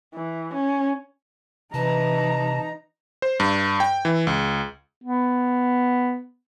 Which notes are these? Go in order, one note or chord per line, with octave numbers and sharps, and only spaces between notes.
E3
C#4
C3 E3 D#4 B4 A5 A#5
C5
G2
G5
E3
C#2
B3